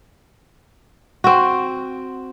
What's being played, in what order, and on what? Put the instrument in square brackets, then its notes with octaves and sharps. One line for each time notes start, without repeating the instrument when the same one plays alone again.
[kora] C4 F#4